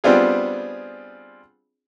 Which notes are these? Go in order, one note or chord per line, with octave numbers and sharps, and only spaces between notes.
G3 B3 C4 D4 F4 G#4